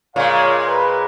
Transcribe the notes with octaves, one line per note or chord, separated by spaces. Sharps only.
A#2 G#3 C#5 F5
B4